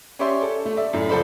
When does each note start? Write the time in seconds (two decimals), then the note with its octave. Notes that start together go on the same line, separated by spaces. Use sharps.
0.19 C#4 G4 C#5 D5 E5 C6
0.42 A4
0.65 A3
0.77 D5 E5
0.93 F#2 A2 A3
1.09 C#2 F3 A4 C5 D5 B5